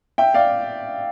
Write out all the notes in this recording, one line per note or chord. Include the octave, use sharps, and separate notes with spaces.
E5 G5
D5 F5